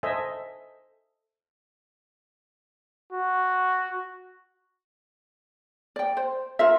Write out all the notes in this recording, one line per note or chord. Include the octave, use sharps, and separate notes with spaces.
A4 C5 D#5 E5 G#5
F#4
D5 G5
C5
F4 A#4 E5